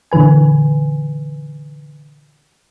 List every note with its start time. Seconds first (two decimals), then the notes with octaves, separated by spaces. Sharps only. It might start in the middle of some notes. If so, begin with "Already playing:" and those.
0.12 A#2 D3 E3 B4 G#5